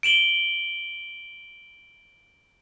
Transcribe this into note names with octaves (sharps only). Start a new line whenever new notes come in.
D7 E7 F#7 G7